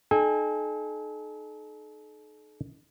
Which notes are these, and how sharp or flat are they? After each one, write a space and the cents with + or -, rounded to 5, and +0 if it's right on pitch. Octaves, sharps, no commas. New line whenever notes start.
D#4 -30 A4 -45 G#5 -35